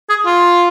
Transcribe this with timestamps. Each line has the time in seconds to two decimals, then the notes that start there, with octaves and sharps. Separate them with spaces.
0.09 G#4
0.26 F4